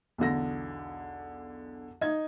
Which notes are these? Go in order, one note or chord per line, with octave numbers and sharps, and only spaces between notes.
B1 E2 D3 A#6
D#4 G#6